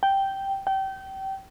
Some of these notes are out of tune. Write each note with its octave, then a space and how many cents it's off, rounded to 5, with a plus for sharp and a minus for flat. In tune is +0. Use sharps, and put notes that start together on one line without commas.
G5 -5
G5 -25